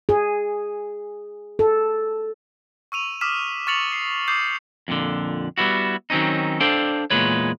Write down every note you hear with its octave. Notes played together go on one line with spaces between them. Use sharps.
G#4
A4
C#6 E6 D#7 F7
D6 D#6 F6 B6 E7
C#6 F6 A6 C#7 F7 F#7
C7
D6 D#6 G6 C7
F2 A#2 D3
G3 B3 E4 F#4
D#3 F#3 C4 C#4 D#4
D4 A4 C5 D5 F5 G5
E2 A#2 G#3 B4 C#5